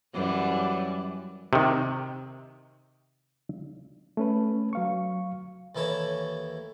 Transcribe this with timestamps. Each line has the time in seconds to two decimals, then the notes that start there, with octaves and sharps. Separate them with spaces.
0.14 F#2 E3 G3
1.53 C3 D#3
4.17 A3 C#4 B4
4.73 F#3 F5 C#6
5.75 D#2 E3 E4 A4 C#5 A5